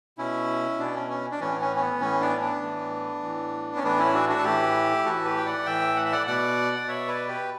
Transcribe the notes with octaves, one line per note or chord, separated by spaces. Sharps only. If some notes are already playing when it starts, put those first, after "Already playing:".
B2 C#4 E4
B2 B3 D4
C#4
C#4
D4
A2 E3 C#4
C#4
C#4
B3
A2 E3 C#4
B3 D4
B3 D4
A2 E3
A2 E3
C#4
A2 E3 B3 D4
C#4 E4
D4 F#4
D4 F#4
A4
A2 E3 E4 G4
A2 E3 F#4 A4
G4 B4
G5
D5 F#5
A2 E3 E5 G5
F#5
E5
D5 F#5
B2 D5 F#5
D5
B2 C#5 E5
B4 D5
G4 B4